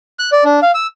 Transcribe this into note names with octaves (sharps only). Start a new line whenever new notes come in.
F#6
D5
D4
F5
E6